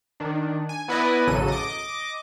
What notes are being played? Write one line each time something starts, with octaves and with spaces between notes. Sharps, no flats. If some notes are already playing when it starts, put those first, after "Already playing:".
D#3 D4
G#5
B3 E4 B4 D5 D#5 G#5
A1 F#2 C#3 F#3 A4 D#7
D#5 D6